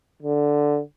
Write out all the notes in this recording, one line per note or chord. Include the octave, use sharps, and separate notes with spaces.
D3